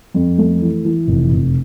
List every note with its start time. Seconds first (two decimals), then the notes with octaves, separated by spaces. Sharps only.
0.14 F2
0.38 A3
0.61 E3
0.85 E3
1.08 F1
1.32 F1